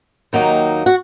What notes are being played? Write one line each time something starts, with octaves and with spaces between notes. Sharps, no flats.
D#2 D#3 F#3 A#3 D#4
F#4